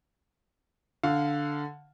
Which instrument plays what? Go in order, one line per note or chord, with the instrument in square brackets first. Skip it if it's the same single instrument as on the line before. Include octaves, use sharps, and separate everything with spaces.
[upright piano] D3 [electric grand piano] F5